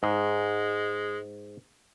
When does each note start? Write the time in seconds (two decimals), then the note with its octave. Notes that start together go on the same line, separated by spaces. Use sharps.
0.03 G#2 G#3